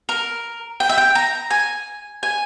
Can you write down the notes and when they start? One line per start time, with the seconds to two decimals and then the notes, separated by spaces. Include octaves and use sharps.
0.09 A#4
0.80 G5
0.89 E5
0.98 G5
1.15 A#5
1.51 G#5
2.23 G#5